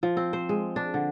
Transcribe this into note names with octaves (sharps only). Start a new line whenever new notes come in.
F3
C4
C5
G#3
D4
D3